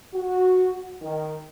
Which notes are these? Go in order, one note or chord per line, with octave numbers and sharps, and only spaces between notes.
F#4
D#3